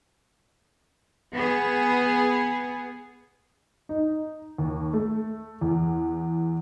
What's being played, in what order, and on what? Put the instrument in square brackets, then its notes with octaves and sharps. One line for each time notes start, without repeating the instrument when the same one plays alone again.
[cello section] B3 G#4
[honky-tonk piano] D#4
D#2
A3
E2